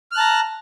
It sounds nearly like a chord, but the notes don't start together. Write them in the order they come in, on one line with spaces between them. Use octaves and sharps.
F6 F#6 A5 A#5